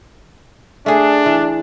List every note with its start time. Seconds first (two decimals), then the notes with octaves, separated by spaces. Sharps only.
0.86 A3 D4 G#4
1.26 E3